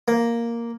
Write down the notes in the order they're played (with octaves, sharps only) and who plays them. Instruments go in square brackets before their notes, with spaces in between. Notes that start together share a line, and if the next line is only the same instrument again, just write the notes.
[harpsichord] A#3